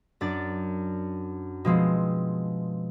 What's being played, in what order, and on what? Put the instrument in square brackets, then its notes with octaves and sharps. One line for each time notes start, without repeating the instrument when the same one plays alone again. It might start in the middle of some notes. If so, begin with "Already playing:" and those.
[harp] F#2 D4 D5 A6
B2 F3 G#3 C4